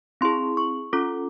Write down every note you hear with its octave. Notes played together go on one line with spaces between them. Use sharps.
C4 E4 G#4 C6
C#6
C#4 F4 A4 D6